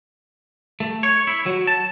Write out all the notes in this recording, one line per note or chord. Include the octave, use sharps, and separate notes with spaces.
A3
C#5
E4
F#3
A5